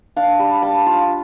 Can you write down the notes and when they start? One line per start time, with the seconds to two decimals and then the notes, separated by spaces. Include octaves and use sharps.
0.16 D4 F5
0.39 G3
0.62 G3 A5
0.86 F4